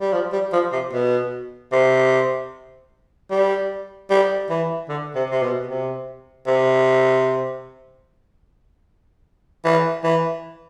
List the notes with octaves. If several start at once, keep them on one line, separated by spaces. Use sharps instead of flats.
G3
F3
G3
F3
C3
B2
C3
G3
G3
E3
D3
C3
C3
B2
C3
C3
E3
E3